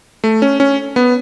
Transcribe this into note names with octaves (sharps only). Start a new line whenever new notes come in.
A3
C#4
C#4
B3